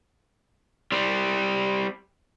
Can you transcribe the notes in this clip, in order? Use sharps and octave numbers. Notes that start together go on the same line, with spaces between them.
G3 C4